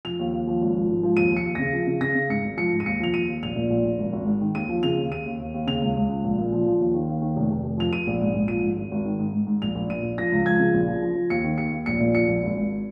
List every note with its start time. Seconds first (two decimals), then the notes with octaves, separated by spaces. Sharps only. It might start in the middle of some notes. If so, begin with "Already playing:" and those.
0.05 F3 F7
0.19 D#2
0.33 D#2
0.47 F3
0.61 G#1
0.75 F3
0.89 G#2
1.03 F3
1.17 D#2 D#7
1.31 F3
1.37 C#7
1.45 D#2
1.55 C#3 A#6
1.73 F3
1.87 C#3
2.01 C#3 A#6
2.15 C#3
2.29 G#2 C#7
2.44 G#1
2.57 F3 C#7
2.72 G#2
2.80 D#7
2.86 D#2 C#7
3.00 F3 F7
3.14 D#2 D#7
3.28 D#2
3.43 A#1 F7
3.56 A#2
3.70 A#1
3.85 A#1
3.98 G#1
4.13 G#1
4.26 G#2
4.41 D#3
4.55 D#2 D#7
4.69 F3
4.83 C#3 F7
4.97 D#2
5.10 D#2 D#7
5.25 D#2
5.40 D#2
5.54 D#2
5.67 C#3 F7
5.81 C#2
5.96 C#2
6.09 C#2
6.24 A#1
6.38 A#2
6.52 F3
6.66 F3
6.80 D#2
6.94 D#3
7.09 D#2
7.22 D#3
7.36 F1
7.51 F1
7.64 F1
7.78 F3 F7
7.92 F3 D#7
8.07 A#1
8.21 G#2
8.34 A#1
8.48 F3 D#7
8.63 G#2
8.77 G#1
8.91 G#1
9.05 D#3
9.19 G#2
9.33 G#2
9.47 G#2
9.62 A#1 F7
9.75 A#1
9.89 A#2 D#7
10.03 A#1
10.18 F3 A#6
10.32 C#2
10.45 F3 G#6
10.59 C#3
10.74 A#1
10.87 F3
11.03 F3
11.15 F3
11.30 D#2 C#7
11.44 D#3
11.58 D#2 C#7
11.72 D#2
11.86 A#1 C#7
12.00 A#2
12.15 F3 C#7
12.28 A#1
12.43 G#1
12.56 G#1